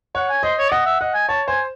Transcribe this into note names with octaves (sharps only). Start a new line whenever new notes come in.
C#5 F#5
G#5
C5 D#5
C#5
D#5 F#5
E5
D#5 F#5
G#5
C#5 A5
C5 G#5